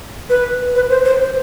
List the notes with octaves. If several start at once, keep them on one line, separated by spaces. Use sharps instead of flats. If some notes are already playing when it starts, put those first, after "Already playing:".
B4
B4
C5
C5